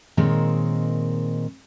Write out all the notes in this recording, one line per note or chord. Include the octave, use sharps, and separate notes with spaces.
A#2 D#3 G#3 C4 C#5